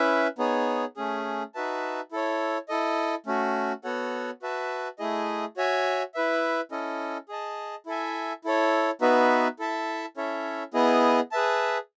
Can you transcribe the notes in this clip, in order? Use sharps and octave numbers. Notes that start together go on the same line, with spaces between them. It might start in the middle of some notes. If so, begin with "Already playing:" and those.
Already playing: C#4 E4 B4 E5
B3 D#4 G#4 C#5
A3 C#4 G#4
D#4 F#4 B4 E5 A5
E4 A4 C#5
E4 A4 D#5
A3 C#4 F#4
B3 F#4 A4 C#5 F#5
F#4 B4 E5 A5
A3 E4 G#4 D#5
F#4 C#5 E5 G#5
E4 B4 E5
C#4 E4 A4 D#5
G#4 D#5 A5
E4 A4 E5 G#5
E4 A4 C#5
B3 D#4 F#4 B4 E5
E4 A4 E5 A5
C#4 E4 A4 C#5 E5
B3 E4 G#4 D#5
G#4 B4 E5 A5